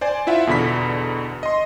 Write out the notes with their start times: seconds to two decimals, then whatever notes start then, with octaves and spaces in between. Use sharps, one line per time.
0.01 C5 D5 G#5
0.27 E4 F4 E5 F#5
0.47 E2 B2 D3 B5 B6
1.43 D#5 C6